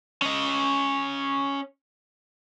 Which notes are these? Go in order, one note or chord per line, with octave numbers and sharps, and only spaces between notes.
C#4 D#5